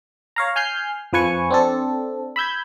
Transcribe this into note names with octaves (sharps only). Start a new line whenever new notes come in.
C#5 F5 A#5
G#5 F6 G6 C7
F2 F3 B4 G#5 C#6
C4 D4 A4
B5 E6 G6 G#6